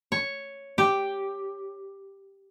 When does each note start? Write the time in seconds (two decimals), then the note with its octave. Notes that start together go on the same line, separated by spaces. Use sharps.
0.12 C#5
0.78 G4